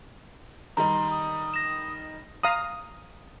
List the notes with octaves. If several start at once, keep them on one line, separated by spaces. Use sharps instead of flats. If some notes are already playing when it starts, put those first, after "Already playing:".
D#3 G3 D#4 A#5 C6
D#6
A#6 E7
F5 A#5 D#6